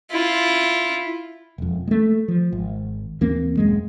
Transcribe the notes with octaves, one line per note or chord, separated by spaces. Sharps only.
E4 F4
E1 F2
G#3 A3
F3
G#1
D#2 E3 A#3 C4
D#1 F#2 G#3